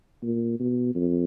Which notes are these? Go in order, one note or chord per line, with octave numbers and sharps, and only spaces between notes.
A#2
B2
F2